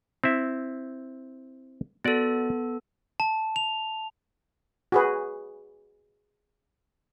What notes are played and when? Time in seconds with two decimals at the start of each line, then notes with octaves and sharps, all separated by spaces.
0.24 C4 E4 E5
2.05 B3 F#4 A4 D5
3.20 A5
3.56 F7
4.92 F#4 G#4 B4